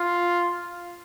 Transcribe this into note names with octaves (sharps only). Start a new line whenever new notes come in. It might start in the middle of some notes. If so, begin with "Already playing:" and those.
Already playing: F4